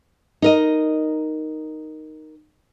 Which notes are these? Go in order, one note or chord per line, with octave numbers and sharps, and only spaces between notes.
D#4 A#4 D#5